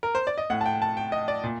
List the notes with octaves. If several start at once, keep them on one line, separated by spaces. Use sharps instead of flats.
A#4
C5
D5
D#5
A2 F#5
A5
G5
A5
G5
D#5
D5
A#2